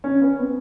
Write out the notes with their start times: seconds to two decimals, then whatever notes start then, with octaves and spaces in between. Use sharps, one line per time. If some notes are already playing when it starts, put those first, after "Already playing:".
0.04 C#4
0.22 B3
0.40 C4